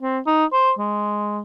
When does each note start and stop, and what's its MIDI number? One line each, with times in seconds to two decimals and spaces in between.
0.02 0.19 60
0.27 0.45 63
0.53 0.72 72
0.79 1.41 56